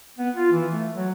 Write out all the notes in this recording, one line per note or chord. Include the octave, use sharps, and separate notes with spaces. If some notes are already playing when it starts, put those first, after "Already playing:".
B3
F4
E3
A3
F#3